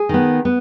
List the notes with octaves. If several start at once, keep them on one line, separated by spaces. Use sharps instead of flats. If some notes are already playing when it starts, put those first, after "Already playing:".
Already playing: G#4
D#3 B3
B3